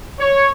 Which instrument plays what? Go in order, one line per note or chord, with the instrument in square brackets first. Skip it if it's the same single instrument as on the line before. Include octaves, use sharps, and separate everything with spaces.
[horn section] C#5